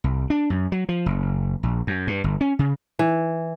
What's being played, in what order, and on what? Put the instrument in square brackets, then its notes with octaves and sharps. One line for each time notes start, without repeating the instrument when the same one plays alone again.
[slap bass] C2
D4
F#2
F#3
F3
F#1
A#1
F#2
G2
G1
C#4
C#3
[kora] E3